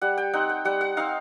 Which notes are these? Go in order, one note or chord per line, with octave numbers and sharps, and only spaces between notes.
G3 F#5
G5
C4 D#4 F#5
G5
G3 F#5
F#5
C4 D#4 F5